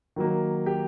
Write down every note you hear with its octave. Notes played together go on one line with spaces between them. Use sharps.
D#3 F#3 A#3
G4